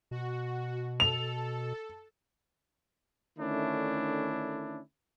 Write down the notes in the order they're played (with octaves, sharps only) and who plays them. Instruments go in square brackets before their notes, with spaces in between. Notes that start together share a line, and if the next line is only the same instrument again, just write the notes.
[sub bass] B2 [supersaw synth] F#4
[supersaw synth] A4 [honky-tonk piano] F7
[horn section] D3 D#3 A3 C#4 D4 E4